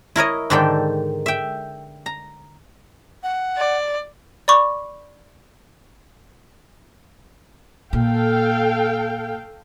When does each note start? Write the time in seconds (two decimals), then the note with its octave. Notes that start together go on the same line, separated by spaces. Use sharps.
0.16 E4 A#4 C#5 D#5
0.50 G#2 D3 D#3 A4 D5 G5
1.26 E5 G5
2.06 A#5
3.23 F#5
3.57 D5
4.48 D5 B5 C#6 D6
7.93 A#2 A4 F5 G5